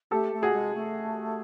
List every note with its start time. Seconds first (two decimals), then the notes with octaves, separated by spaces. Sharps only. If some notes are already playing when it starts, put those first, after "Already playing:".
0.11 A3 G4 A4
0.33 A3
0.42 F#4 G#4
0.53 G#3
0.74 A3